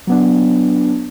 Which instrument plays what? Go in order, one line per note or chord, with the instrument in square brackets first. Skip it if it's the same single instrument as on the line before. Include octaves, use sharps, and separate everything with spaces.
[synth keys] F#3 B3 D4